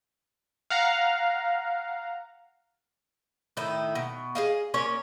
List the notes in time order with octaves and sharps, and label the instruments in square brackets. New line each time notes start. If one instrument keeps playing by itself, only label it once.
[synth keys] F5 F#5 A#5
[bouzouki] A2 D#3 D#4 E4
B2
G#4 D#5 F5
A#3 C#4 A#4 C#5